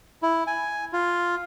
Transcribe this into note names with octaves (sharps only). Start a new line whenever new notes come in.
E4
G#5
F4